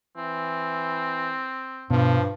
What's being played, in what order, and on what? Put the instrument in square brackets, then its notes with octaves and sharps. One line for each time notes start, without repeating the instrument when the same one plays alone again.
[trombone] E3 [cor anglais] C4
[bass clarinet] G2 [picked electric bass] B2 [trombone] F3